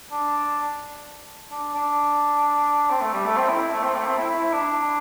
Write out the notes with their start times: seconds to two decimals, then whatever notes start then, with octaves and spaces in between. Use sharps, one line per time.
0.11 D4
1.51 D4
1.74 D4
2.90 C4
3.01 A3
3.13 G3
3.25 A3
3.36 C4
3.48 E4
3.71 A3
3.83 C4
3.95 A3
4.06 C4
4.18 E4
4.29 E4
4.53 D4